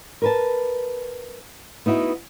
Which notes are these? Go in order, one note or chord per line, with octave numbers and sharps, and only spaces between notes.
A#4 B4 A5
B3 D#4 E4 F#4